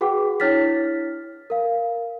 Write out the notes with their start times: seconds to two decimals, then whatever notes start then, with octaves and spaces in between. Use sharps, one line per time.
0.01 F#4 G#4 B4 F#5 G5 D6
0.40 D4 E4 C#5 F6 A6 B6
1.50 A#4 F5